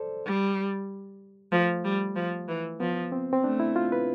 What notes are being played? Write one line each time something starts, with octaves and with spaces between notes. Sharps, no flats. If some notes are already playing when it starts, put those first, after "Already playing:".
Already playing: A4 C5 D5
G3
F3 A3
G3
F3
E3
F3 B3
C4
C4
A3 D4
E4
F4
B4